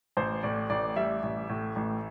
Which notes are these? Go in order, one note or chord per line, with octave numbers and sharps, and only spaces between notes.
A1 C5
A2 D5
A1 D5
G3 E5
A1
A2
A1